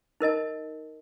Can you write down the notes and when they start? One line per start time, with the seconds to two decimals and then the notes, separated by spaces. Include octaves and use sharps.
0.20 D#4 A#4 D#5 A5